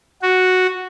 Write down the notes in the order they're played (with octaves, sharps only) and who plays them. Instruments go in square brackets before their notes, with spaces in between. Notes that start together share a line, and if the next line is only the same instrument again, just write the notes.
[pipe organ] F#4